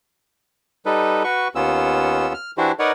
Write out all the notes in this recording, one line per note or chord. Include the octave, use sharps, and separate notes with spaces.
G3 D#4 A4 B4
F#4 B4 C#6
D#2 B3 C#4 F4 E6
F6
E3 D4 E4 F#4 G4 C5
D#4 A#4 B4 C#5 D5 F#5